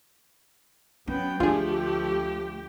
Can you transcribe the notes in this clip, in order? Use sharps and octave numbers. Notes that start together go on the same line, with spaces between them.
F#3 B3 C#4 G5
D2 F3 A3 D4 F4 G4 G#4